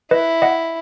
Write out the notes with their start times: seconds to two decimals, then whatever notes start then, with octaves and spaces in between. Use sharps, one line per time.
0.11 E4 B4 D#5
0.42 D#5 F#5